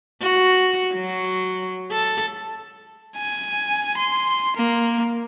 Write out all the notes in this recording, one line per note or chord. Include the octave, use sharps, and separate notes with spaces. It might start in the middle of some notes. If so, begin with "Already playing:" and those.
F#4
F#3
A4
G#5
C6
A#3